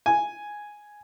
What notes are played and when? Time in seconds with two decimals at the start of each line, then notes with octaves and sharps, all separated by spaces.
0.06 G#5